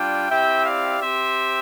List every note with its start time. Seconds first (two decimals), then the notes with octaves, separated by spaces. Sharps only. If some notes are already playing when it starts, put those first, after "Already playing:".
Already playing: G3 D4 F4 G5
0.28 C4 E4 G4 E5 G5
0.65 D5 F5
1.00 C4 G4 C5 E5